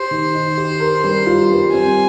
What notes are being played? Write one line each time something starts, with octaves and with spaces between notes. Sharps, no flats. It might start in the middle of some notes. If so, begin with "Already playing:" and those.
Already playing: G4 C5
D#3
D#4
G4
A#4
G3
F4
G3
C4 G#5